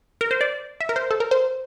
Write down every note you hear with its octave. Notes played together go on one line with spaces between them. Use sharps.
A#4
C5
D5
E5
A#4
C5
A4
A#4
C5